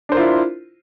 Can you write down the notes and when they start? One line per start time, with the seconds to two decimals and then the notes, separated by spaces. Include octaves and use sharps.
0.09 D4
0.12 C5
0.14 A#4
0.17 F4
0.20 E4